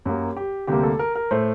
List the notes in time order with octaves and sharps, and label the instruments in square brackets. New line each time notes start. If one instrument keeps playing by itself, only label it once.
[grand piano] F#2 F#3 A#3 G4
G4
D2 C3 G3 A#3 G4
A4
A#4
A#4
A2 A3 C5